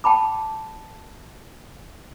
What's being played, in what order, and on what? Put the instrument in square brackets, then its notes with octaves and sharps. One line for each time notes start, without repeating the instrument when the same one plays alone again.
[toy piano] G5 A5 B5 D6